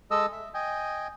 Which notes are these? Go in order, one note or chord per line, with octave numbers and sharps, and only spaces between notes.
G#3 A4 D#5 E6
E5
D#5 G5 G#5